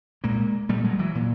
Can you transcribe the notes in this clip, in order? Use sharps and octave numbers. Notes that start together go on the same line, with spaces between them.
A#2 G#3 A#3
A#2 G3 A3
F#3 G#3
E3 F#3
A#2